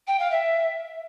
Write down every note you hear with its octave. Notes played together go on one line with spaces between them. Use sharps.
G5
F5
E5